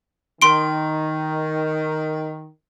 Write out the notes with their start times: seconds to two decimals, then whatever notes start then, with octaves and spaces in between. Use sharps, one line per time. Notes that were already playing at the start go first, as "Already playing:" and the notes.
0.42 D#3 C6 D7